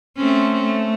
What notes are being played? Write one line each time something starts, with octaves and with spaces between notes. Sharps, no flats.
A3 C4 C#4
A3